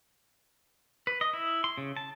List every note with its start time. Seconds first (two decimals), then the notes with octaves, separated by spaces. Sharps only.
1.07 B4
1.21 D#5
1.33 E4
1.64 C6
1.77 C#3
1.97 A5